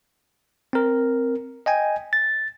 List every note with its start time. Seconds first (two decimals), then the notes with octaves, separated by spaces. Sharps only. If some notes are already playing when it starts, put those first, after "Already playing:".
0.73 C4 A#4
1.66 D#5 G5 G#5
2.13 A6